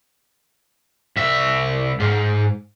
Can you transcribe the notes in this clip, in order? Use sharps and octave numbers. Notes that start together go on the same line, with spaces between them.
C2 E5
G#2